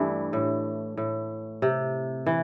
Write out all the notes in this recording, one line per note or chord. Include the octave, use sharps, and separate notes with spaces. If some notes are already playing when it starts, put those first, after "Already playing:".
Already playing: G2 E3 G3 A3
A2
A2
C3
E3